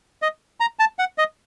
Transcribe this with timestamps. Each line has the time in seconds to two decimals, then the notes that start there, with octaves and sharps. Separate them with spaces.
0.22 D#5
0.60 A#5
0.79 A5
0.99 F#5
1.18 D#5